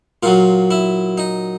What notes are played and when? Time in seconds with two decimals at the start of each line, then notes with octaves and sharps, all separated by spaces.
0.23 A#2 F#3 F4
0.71 E4
1.18 D#4